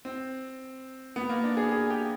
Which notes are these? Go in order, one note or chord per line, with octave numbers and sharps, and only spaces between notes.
C4
B3
A#3
D4
G#4
G#4
G4